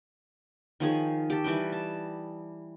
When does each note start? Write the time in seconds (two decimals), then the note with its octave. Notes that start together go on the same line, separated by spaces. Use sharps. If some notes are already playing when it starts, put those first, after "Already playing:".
0.80 D#3 F3 G#4 C#5
1.30 G4 A4
1.44 E3 G3 D#5 G5
1.72 A5